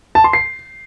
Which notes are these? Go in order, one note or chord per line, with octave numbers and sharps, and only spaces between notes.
A5
C6
C7